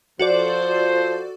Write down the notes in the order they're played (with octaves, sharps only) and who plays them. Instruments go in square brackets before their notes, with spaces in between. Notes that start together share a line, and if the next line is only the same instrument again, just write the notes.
[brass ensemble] F3 C5 [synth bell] F#4 A4 D5